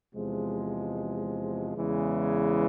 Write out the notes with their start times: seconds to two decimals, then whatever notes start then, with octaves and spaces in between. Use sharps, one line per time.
0.14 E2 C3 F3 G#3
1.77 E2 C#3 E3 G#3